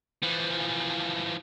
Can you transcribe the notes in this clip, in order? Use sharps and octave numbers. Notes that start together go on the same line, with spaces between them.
E3 F3